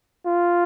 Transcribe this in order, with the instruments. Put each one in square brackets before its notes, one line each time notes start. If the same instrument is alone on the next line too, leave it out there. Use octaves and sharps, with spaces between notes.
[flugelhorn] F4